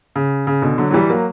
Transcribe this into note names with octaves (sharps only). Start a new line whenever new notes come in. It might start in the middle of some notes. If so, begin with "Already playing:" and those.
C#3
C#3
B2 D3
D3 F#3
F#3
E3 G3
F#3 A#3